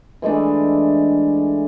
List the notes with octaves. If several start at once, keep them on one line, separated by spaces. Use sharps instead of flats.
E3 G#3 A3 D4